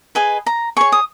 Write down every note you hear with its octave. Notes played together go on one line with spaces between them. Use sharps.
G#4 B4 D#5 G#5
A#5
G#4 C#5 C#6
D#6